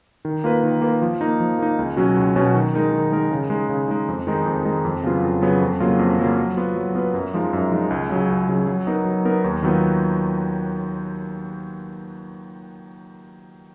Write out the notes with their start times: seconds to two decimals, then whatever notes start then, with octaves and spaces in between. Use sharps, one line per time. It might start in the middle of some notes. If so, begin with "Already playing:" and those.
0.25 D#3
0.44 A#3 F4 B4
0.64 D#3
0.82 A#3 F4 B4
1.02 F3
1.21 A#3 D#4
1.40 F3
1.59 A#3 D#4
1.79 C#2
1.97 B2 F#3 C#4 F#4
2.17 C#2
2.35 B2 F#3 C#4 F#4
2.55 D#3
2.74 G#3 D#4 A#4
2.92 D#3
3.12 G#3 D#4 A#4
3.31 C#3
3.50 G#3 D#4
3.70 C#3
3.88 G#3 D#4
4.08 F2
4.27 D#3 G#3 D#4
4.46 F2
4.65 D#3 G#3 D#4
4.85 F2
5.04 C#3 F#3 B3 F4
5.22 F2
5.41 C#3 F#3 B3 F4
5.61 F2
5.80 C#3 F#3 A#3 F4
5.99 F2
6.18 C#3 F#3 A#3 F4
6.38 F#3
6.57 B3 F4 B4
6.76 F#3
6.95 B3 F4 B4
7.14 F#2
7.34 F3 G#3 D#4
7.53 F#2
7.71 F3 G#3 D#4
7.90 C#2
8.09 C#3 F#3
8.29 C#2
8.49 C#3 F#3
8.67 F#3
8.87 B3 D#4 A#4
9.05 F#3
9.25 B3 D#4 A#4
9.44 D#2
9.63 D#3 F#3 B3 F4